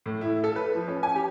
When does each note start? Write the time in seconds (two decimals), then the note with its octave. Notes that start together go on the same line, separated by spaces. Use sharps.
0.06 A2
0.21 E4
0.44 A4
0.56 B4
0.75 F3
0.88 C#4
1.03 G#5
1.15 G4